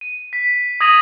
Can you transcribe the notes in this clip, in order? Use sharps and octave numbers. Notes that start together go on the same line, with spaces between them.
D#7
B6
D#6 G#6 A#6 D#7 F7 F#7